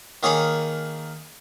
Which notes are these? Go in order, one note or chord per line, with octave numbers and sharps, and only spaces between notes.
D#3 A#3 G#4 C#5 G#5 B5